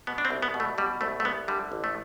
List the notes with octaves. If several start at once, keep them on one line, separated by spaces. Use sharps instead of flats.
B2 B3
D4
C4
C2
B3
B2
A3
B2 G3
C2 A3
A3
C2 B3
D3 G3
A1
A3